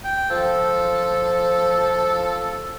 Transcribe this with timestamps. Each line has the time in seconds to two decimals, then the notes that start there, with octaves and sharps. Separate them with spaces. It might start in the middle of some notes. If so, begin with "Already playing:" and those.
0.04 G5
0.30 F3 A4